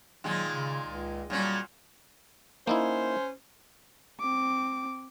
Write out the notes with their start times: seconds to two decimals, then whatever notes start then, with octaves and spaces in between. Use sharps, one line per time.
0.24 A#2 D#3 F#3 G#3
0.51 C#3
0.86 C#2
1.30 A#2 F#3 G3 C#4
2.67 A#3 C#4 D#4 E4 C5
4.20 C4 D6